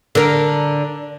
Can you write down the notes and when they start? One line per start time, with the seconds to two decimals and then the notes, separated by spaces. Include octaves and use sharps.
0.15 D3 A#4